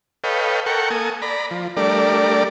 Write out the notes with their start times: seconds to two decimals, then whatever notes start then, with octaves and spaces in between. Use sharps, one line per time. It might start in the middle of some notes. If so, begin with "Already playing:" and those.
0.24 A4 B4 C#5 D#5 F5 G5
0.66 A4 A#4 F#5 G5 C#6
0.90 A#3 A4 G#5 D#6
1.22 D5 A#5 B5
1.51 F3
1.77 G3 A3 D4 A#4 D5